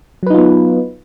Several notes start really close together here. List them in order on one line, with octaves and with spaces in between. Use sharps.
F#3 B4 D#4 F4 B3